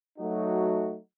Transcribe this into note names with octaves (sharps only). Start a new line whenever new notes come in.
F#3 A3 D#4 F#4